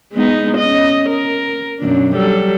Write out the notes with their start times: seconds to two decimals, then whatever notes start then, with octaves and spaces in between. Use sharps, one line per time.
0.13 G#3 B3 D#4
0.58 C#4 D#5
1.09 A#4
1.80 F#2 B2 D4
2.15 F#3 G3 A4